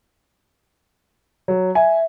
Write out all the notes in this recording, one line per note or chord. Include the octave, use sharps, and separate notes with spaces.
F#3
E5 G#5